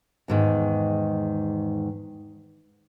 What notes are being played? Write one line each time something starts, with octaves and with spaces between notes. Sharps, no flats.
E2 G#2 D#3